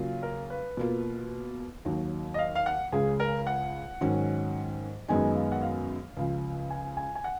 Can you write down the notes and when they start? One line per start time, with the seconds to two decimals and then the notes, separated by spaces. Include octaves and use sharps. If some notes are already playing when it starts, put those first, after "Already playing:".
Already playing: C#3 F#3 A#3 F4
0.23 A#4
0.50 B4
0.77 B2 A#3 F4
1.85 D#2 D#3 F#3
2.34 D#5
2.39 F5
2.55 F5
2.66 F#5
2.92 C#2 C#3 G#3 C#4 G#4
3.20 A#4
3.47 F#5
4.01 G#2 D#3 F#3 C#4
5.08 F#2 D#3 G#3 B3 D#4 G#5
5.35 F5
5.52 F#5
5.62 F5
6.17 C#2 C#3 F3
6.70 G#5
6.97 G#5
7.15 G#5
7.24 F#5